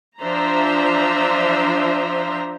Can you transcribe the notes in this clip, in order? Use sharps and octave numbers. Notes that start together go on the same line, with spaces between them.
F3 D4 C5 E5 A#5